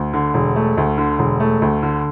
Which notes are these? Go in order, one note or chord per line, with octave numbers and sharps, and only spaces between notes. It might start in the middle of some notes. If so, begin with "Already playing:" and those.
Already playing: D2
D3
E1
A3
D2
D3
E1
A3
D2
D3